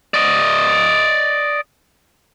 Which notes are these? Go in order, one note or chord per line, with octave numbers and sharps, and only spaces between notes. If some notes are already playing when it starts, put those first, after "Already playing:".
D5 D#5